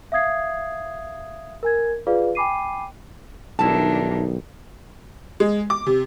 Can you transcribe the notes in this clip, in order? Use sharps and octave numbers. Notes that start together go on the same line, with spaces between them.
E5 F5 D#6 G#6 C7
A#4 G#5 G#6
F4 G#4 B4 D5 F5
G5 G#5 B5 D6 C7 D#7
B1 D#3 G3 D4 E4 A5
G#3
D6
C3